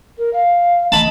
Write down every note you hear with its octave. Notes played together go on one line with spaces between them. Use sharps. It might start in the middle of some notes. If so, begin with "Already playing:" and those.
A#4
F5
D#5 A5 B5